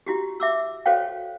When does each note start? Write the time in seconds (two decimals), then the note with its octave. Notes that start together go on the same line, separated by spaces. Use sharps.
0.06 E4 F#4 G4
0.40 E5 D6 E6
0.86 F#4 A4 C5 C#5 F5 G5